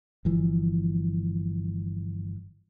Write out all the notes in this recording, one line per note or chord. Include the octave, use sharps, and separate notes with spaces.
G1 E3 F3